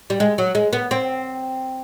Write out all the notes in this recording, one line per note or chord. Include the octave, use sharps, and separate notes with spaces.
G3
G#3
F#3
G#3
B3
C4